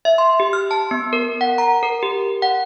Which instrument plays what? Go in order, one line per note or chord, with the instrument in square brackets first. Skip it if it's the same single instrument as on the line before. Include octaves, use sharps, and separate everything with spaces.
[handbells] E5
C6
G4
F6
A5
B3
A#4
F#5
A#5
A#4
G4
F#5